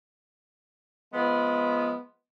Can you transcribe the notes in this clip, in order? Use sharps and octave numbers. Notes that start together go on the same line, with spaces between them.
F3 G#3 B3